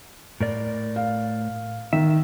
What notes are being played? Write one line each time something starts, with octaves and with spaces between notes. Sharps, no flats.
A2 A#4 D5
F5
D#3 E5